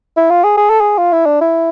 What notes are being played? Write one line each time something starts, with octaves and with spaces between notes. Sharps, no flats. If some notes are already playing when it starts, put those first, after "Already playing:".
E4
F4
G#4
G#4
A4
G#4
F4
E4
D4
E4